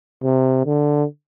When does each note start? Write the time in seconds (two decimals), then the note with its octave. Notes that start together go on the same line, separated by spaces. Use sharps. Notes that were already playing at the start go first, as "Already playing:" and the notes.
0.23 C3
0.66 D3